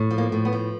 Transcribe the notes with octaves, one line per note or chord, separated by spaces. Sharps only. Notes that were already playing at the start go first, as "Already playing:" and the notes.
Already playing: A2
F3
A#3
A2
B3
F3